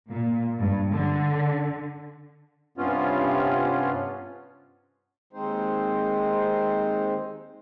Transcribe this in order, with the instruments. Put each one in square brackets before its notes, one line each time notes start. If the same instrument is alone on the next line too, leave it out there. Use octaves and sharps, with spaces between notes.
[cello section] A#2
G2
D3
[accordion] G2 C3 B3 C#4 F4
[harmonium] D#2 G#3 C4 D#4 C5